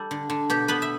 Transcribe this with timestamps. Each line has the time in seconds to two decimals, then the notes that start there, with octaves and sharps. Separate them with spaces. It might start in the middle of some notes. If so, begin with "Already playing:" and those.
Already playing: G3 A4
0.11 D3
0.30 D3
0.50 B2 G4
0.68 B2 B3 B4
0.82 E5